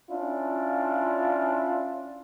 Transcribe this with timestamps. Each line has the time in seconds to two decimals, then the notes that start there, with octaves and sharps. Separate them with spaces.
0.10 C#4 D4 E4 F4